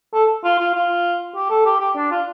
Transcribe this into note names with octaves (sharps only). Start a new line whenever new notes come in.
A4
F4
F4
F4
G4
A4
G4
G4
D4
F4